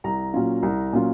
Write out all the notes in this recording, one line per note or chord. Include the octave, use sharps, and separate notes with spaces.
C2 A#5
A#2 F#3 C#4 F4
C2
A#2 F#3 C#4 F4